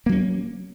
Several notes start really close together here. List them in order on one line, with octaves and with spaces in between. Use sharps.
A#3 F#3 C#4